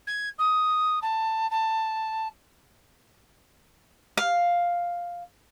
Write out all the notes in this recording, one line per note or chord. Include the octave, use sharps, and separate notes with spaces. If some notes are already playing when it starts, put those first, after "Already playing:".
G#6
D#6
A5
A5
F5